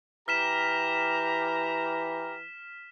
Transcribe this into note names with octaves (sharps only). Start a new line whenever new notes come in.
E3 G4 A#5 F6 B6 E7